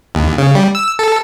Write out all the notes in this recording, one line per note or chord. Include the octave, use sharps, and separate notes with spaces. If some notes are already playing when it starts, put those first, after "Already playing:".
D#2
C#3
G3
E6
A4